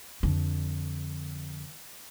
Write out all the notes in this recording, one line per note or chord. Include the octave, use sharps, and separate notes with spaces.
F2 D3